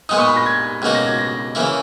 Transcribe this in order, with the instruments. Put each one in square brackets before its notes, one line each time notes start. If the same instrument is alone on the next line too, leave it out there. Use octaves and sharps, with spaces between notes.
[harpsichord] A#2 G#3 B3 D#4 [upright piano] D#6
[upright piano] C#6
B5
A#6
G#6
[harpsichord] C#2 B2 A#3 D#4 F#4
[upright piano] A#6
G#6
A#6
[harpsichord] C#3 E3 A#3 E4